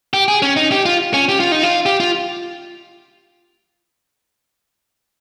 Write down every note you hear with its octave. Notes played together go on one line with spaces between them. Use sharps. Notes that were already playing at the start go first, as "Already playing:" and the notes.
G4
G#4
C#4
D#4
G4
F4
C#4
G4
F4
D#4
F4
G4
F4